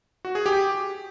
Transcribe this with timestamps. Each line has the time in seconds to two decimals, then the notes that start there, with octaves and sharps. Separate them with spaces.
0.25 F#4
0.35 G#4
0.46 G4